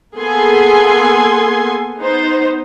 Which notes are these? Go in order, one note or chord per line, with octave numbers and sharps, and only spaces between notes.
A#3 B3 G#4 A4 G#5 C6
B3 D#4 C5